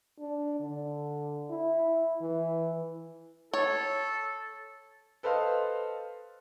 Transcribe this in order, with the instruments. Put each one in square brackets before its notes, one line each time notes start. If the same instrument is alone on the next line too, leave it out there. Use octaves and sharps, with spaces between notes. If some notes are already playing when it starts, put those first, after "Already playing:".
[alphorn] D4
D3
E4
E3
[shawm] A4 [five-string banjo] C#5
[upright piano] A4 B4 C5 D#5 F5